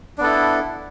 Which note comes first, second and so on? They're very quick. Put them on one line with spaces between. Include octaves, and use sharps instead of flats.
D4 B3 A4 E4